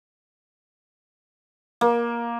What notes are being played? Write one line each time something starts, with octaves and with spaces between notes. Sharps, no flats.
A#3